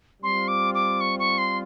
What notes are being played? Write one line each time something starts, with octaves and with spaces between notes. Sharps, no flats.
G3 C4 F4 C6
D6
D6
C#6
C#6
C6